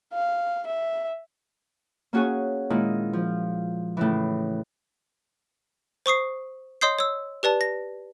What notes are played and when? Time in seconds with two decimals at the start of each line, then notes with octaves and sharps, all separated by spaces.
0.14 F5
0.67 E5
2.13 A#3 C#4 F#4 G#4 C#5 G#5
2.70 A#2 D#3 G#3 E4
3.13 F3
3.97 A2 C#3 E3
6.06 C5 C#6 D#6 C7
6.81 C#5 D#5 C6 D#6 G6 C7
6.99 C#5 E6
7.43 G4 B4 D5 A5
7.61 A#6